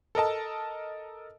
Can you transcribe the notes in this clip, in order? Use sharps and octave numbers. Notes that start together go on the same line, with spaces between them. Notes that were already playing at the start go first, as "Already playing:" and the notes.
A4 A#4 D#5 A5